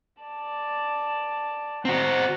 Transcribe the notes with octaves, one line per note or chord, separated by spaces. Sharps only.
D5 A5
C4 F#4 F#5 G5 A#5